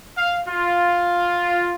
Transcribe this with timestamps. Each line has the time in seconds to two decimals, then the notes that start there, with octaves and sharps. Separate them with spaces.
0.16 F5
0.47 F4